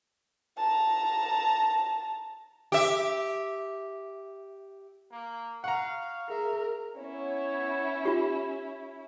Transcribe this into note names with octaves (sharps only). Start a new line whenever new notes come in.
A5 A#5
G4 E5
A#3
F5 F#5 A#5 C#6
G#4 A#4 E5
B3 C#4 E4 C#5
F4 G4